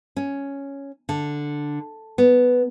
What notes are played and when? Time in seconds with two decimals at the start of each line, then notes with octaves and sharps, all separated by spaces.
0.16 C#4
1.09 D3
2.18 B3